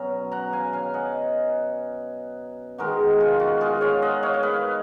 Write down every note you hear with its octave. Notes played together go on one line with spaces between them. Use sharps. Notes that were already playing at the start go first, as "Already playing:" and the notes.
Already playing: B2 F#3 C#4 A#5
F#5 A#5
F5 G#5
F5 G#5
D#5 F#5
D#3 G#3 B3 D#4 F#4 A#4
F4
F#4
F4 G#4
C#5 F5
D#5 F#5
C#5 F5
F5
B4 D#5